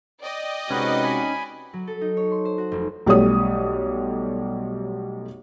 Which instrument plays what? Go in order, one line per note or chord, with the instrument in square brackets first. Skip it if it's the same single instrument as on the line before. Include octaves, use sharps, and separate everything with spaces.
[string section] D5 D#5 G5
[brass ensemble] C3 G#3 F#4 [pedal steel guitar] C#4 D#4 [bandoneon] B4
[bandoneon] G#5 B5
[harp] F#3
A4
D#4
C#5
C6
C5
F#4
F1
[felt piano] B1 G3 A3 C#5 D#6